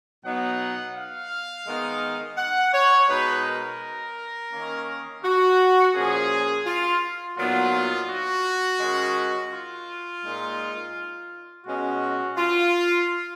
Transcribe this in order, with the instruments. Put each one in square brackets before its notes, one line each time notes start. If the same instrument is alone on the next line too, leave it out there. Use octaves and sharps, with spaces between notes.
[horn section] B2 F#3 B3 D#4 F#5
F5
D#3 G#3 B3 D#4
F#5
C#5
B2 G#3 D#4 B4
A#4
D#3 A#3 C#4
F#4
A#2 F3 A#3 C#4 G#4
F4
A#2 F#3 B3 D#4 F4
F#4
D#3 G#3 C#4
F4
A#2 G#3 D#4
B2 G#3 C#4 F#4
F4